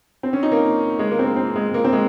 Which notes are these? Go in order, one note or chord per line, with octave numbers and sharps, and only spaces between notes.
C4
C#4
D#4
A#3
G#3
A#3
C4
A#3
C4
G#3
A#3
C4
G#3